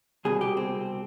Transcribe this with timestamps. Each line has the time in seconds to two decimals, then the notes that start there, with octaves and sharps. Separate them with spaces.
0.25 C2 B2 G#4
0.41 G4
0.57 C4